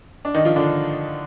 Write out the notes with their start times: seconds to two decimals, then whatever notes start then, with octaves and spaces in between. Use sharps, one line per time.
0.25 D4
0.34 D#3 D#4
0.45 F3 F4
0.56 D3 D4